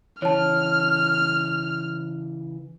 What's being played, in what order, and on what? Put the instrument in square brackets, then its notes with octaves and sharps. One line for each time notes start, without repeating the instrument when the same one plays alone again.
[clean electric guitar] C#3 E3 [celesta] C#5 A5 [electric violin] F6